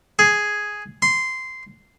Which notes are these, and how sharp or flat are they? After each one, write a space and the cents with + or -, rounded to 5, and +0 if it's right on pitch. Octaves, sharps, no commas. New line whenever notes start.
G#4 +5
C6 -10